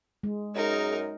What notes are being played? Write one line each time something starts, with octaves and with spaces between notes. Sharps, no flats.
G#3
F#2 D#4 G#4 A#4